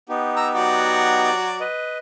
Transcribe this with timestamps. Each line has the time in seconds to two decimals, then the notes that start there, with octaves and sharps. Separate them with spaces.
0.09 B3 D#4 G4
0.36 A#5 E6
0.55 F#3 F#4 D5
1.60 B4 D#5